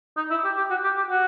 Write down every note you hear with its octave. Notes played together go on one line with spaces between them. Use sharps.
D#4
E4
G4
G4
F#4
G4
G4
F#4